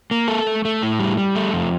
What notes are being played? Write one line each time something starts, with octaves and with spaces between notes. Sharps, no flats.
A#3
A4
A3
A3
A2
G3
G3
A3
F2